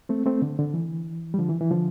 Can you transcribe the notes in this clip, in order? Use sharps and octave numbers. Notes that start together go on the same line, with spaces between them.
A3 C4
A3 C4
D3
D3
E3
G3
D3 F3
E3
E3
D3 F3